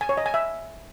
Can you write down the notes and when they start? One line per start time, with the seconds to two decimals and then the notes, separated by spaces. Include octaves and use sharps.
0.01 G#5
0.09 C#5
0.17 D#5
0.26 G#5
0.34 E5